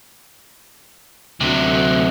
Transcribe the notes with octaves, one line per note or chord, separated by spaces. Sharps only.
D2 C3 F#3